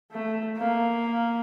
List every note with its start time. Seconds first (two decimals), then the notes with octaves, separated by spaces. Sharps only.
0.12 A3
0.57 A#3